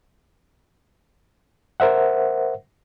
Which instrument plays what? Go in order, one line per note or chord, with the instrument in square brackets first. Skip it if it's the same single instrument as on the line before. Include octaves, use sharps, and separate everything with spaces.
[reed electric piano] A#4 C5 E5 F#5